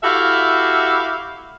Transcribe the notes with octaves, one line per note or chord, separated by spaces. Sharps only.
E4 F#4 G4 A4 E5 F5